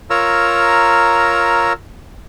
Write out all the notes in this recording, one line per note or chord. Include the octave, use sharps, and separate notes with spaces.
F4 A#4 C#5 A#5 E6